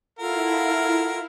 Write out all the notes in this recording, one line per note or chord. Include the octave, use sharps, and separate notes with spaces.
E4 F4 A4 A#4 F5 F#5